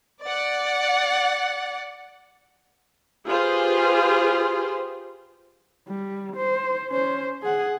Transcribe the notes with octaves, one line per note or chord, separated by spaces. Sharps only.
D5 F#5
F4 G4 G#4 B4 C5
G3
C5
C#4 C5
G#4 F#5